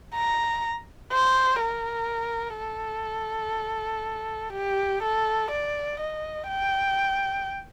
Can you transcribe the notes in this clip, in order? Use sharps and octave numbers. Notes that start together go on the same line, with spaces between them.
A#5
C5
A#4
A4
G4
A4
D5
D#5
G5